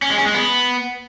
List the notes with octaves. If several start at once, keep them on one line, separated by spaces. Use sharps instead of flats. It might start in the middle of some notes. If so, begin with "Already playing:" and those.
C#4
G#3
C#4
G#3
B3